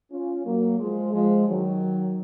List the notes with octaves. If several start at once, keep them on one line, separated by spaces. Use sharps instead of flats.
C#4 F4
F#3 A#3
F3 G#3
F3 G#3
D#3 F#3